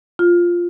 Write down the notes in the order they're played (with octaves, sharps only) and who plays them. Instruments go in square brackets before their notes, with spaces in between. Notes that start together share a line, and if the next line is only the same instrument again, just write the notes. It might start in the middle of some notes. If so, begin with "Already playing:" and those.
[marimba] F4